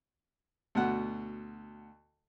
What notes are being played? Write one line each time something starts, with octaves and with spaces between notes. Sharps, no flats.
D2 B2 F#5